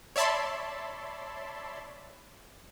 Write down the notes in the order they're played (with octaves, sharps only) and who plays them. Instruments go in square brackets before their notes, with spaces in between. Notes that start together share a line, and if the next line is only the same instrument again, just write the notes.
[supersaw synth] C#5 D5 E5 A5 B5 C6